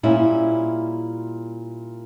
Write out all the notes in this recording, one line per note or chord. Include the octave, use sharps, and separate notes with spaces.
A#2 G3 C#4 E4